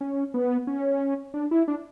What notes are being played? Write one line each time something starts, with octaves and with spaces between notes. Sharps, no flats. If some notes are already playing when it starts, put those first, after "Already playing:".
C#4
B3
C#4
D4
E4
D4